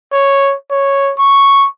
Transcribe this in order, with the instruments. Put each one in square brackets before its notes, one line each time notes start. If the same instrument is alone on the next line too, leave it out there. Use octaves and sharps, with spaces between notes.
[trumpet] C#5
C#5
C#6